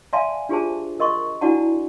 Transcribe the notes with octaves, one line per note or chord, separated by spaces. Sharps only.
D5 E5 F5 G#5 A5 C6
D4 F4 G4 G#4 C5 A5
A#4 D#5 C6 C#6
D4 E4 F#4 D5 F#5 A5